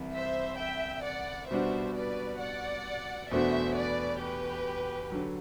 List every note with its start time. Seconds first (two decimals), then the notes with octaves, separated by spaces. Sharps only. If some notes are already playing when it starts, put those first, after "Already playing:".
Already playing: C2 C3 E3
0.14 C5 E5
0.60 E5 G5
1.05 D5 F#5
1.51 B2 G3 B3 D4 F#4 C5 E5
1.96 B4 D5
2.41 D5 F#5
3.31 E2 B2 A3 D4 F#4 C5 E5
3.77 B4 D5
4.22 G4 B4
5.12 D3 F#3